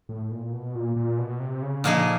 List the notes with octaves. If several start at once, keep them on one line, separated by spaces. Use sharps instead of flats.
A2
A#2
B2
A#2
A#2
B2
C3
C#3
A#2 D3 F3 A#3 D#4 G#4